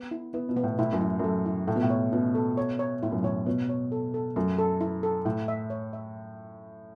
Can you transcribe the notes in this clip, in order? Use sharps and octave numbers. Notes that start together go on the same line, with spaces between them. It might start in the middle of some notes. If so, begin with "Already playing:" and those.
Already playing: B3
E4
B3 E4
B2
B3
A2
A2 E4
F#2
E4
F#2 A4
E4
A2 A4
B2
A2
C#5
B2 C#4
A4
C#5
C#5
A2 E4
F#2
A2 C#5
B2 C#5
C#5
A4
A4
F#2 A3
A4
E4
A4
A2 E4
E5
C#5
E5